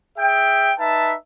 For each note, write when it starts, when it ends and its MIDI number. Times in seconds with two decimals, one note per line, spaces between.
0.18 0.72 68
0.18 0.72 76
0.18 0.72 79
0.79 1.13 63
0.79 1.13 71
0.79 1.13 76
0.79 1.13 81